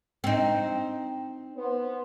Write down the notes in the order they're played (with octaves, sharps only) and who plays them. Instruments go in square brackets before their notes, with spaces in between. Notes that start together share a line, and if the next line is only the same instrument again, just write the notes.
[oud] C4 D#4
[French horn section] B3 C5